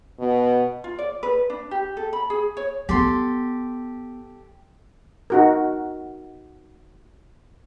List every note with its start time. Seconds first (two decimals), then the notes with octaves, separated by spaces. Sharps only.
0.19 B2
0.84 F4
0.99 D5
1.23 B4
1.50 D4
1.71 G4
1.97 A4
2.13 B5
2.30 G#4
2.57 C#5
2.89 B3 G4 A4 C6
5.30 D#4 F#4 A#4